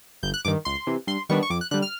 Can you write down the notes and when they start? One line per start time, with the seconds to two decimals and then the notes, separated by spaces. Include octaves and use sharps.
0.23 G1 G6
0.34 F#6
0.45 G2 D#3 D6
0.65 C#2 C6
0.87 C3 E3
1.07 G2 C6
1.29 D#3 G3 B3 D4 C#6
1.43 C#6
1.50 F2 D6
1.61 F#6
1.71 D3 G3 F#6
1.82 F6